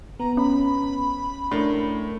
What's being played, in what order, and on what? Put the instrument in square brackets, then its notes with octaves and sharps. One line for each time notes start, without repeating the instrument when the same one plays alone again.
[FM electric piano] B3 [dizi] A#5
[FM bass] C#4 [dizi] B5
[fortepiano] A2 [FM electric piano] D4 A#4